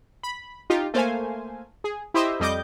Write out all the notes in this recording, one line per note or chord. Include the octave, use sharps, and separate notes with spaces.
B5
D#4 F4 G4
A3 A#3 C5 F5 G#5
G#4
E4 G4 C5 D#5 E5
F2 G3 D#5 D6 G6